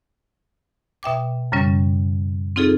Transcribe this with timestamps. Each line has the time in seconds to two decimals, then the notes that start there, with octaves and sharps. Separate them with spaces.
1.03 B2 E5 G5 D6
1.52 F#2 C#3 G3 C#4
2.56 C4 D#4 F4 G#4 A4